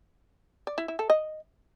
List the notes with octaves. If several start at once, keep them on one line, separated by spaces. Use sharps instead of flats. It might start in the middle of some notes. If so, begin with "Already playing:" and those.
D5
E4
E4
A4
D#5